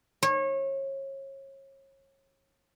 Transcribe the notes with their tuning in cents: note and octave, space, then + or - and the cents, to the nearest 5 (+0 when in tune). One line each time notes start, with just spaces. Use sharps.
C#5 -30